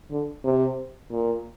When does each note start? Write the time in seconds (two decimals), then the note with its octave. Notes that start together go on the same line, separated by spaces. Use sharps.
0.11 D3
0.44 C3
1.11 A#2